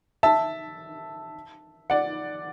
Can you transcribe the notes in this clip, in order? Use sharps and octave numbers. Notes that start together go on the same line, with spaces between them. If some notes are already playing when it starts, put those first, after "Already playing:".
E5 A5
D5 F#5